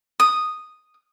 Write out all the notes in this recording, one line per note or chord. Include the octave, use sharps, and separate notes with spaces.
D#6